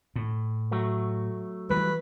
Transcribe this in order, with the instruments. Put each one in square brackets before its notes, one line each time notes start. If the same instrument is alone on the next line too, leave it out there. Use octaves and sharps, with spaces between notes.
[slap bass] A2
[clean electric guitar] F#3 A3
[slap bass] E3 G3 [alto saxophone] B4